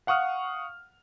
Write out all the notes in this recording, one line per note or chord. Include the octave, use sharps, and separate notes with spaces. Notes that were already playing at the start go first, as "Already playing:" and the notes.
F5 F#5 C#6 D#6 F6